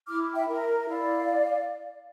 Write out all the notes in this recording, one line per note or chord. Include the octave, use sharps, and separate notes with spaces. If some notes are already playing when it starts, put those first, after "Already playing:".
E4 D6 F6
E5 G5
A#4
E5
E4 D5 F5